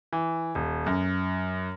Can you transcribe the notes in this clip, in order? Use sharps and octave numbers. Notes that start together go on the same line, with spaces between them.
E3
D#1
F#2